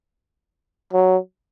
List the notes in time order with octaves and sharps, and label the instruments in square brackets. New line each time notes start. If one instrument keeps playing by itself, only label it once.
[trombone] F#3